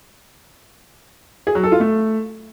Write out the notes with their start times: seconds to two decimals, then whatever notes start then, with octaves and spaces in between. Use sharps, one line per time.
1.47 G#4
1.55 F#3
1.63 A4
1.72 F4
1.80 A3